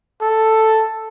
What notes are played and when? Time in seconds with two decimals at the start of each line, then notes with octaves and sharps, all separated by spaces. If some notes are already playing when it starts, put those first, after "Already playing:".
0.21 A4